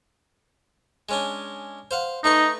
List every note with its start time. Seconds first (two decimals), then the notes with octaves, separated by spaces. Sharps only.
1.09 G#3 C#4 D4
1.91 C5 F5 F#5
2.24 A3 D#4 B4 C#6